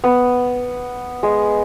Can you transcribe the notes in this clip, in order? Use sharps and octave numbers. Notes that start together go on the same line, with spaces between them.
B3
G#3